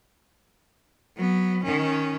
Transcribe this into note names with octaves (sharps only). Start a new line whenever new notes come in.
F#3 B3
D#3 C#4